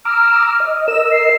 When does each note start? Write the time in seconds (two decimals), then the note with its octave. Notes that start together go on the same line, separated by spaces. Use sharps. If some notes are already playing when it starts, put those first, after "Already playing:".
0.05 A#5 D6 E6 F6
0.60 D#5
0.88 A#4 D#5 E6 E7
1.11 C7